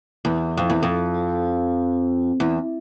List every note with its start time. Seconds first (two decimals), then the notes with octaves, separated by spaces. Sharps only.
0.25 E2
0.57 F2
0.70 E2
0.83 F2
2.40 E2